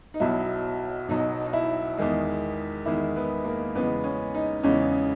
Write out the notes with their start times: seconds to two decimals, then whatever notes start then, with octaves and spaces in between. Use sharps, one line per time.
0.14 D#4
0.20 B1 B2 F#3 E4
1.08 B1 B2 F#3 D#4
1.46 D#4
1.53 E4
1.98 E2 D#3 G#3
2.86 E2 D#3 G#3 E4
3.16 B3
3.45 A#3
3.75 E2 C#3 G#3 B3
4.04 C#4
4.34 D#4
4.63 E2 C#3 G#3 C#4